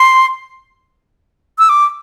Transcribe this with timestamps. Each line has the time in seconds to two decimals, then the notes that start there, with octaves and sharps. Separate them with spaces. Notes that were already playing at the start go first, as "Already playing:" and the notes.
Already playing: C6
1.59 E6
1.69 D6